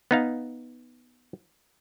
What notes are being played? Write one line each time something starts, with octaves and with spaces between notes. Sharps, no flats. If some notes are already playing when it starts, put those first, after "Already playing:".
B3 D#4 F5